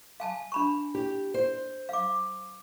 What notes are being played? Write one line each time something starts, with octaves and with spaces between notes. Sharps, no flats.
F5 G#5 A5
D4 B5 C#6
G4
C5
F5 D6